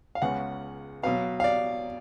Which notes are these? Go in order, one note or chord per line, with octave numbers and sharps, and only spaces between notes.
F5
C#2 C#3 G#3 B3 F#5
B2 F#3 B3 F5
F5
D5